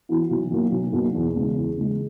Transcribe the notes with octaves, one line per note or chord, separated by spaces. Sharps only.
E3 B3 F#4
B1
B2 F#3 A#3
B1
B2 F#3 A#3
E2
C#3 G#3
E2
C#3 G#3